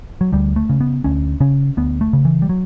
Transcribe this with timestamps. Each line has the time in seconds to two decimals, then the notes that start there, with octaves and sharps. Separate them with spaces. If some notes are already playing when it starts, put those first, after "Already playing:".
0.21 F#3
0.32 D2 G3
0.56 A3
0.69 C#3
0.81 B3
1.04 D2 C#4
1.40 C#3 C#4
1.77 D2 B3
2.01 A3
2.13 C#3
2.25 E3
2.42 G3
2.49 F#3